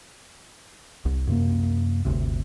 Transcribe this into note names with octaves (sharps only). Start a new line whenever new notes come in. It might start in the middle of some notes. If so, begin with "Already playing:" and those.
C2
F#2 C3 A#3
G1 D2 C3